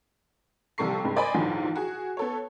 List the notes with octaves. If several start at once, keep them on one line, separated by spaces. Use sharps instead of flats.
A#1 C3 G3 A4 C#6 C7
G2 C3 G#3
A#4 C5 D5 D#5 G#5 B5
A#1 E2 G#2 D3 F3 F#3
F#4 G#4
B3 A4 C#5